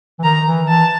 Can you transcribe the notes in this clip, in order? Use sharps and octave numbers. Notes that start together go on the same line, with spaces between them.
E3
D#3 A#5
E3
E3 A5